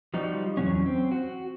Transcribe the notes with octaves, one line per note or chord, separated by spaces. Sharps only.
F3 G3 D#4 F#4
E2 B2 F#3 C#4
C4
F#4